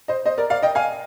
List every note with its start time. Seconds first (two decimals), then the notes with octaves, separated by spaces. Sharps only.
0.08 C5 D#5
0.26 C5 D#5
0.38 A#4 D5
0.50 D5 F5
0.62 D#5 G5
0.75 F5 G#5